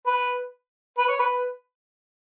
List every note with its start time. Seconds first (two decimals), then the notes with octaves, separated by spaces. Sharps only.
0.07 B4
0.98 B4
1.08 C#5
1.19 B4